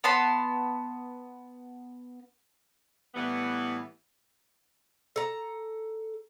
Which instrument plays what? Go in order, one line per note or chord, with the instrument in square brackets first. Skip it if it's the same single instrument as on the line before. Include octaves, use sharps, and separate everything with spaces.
[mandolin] B3 A5 B5 C6
[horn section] A2 E3 G3 B3
[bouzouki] A4 A#5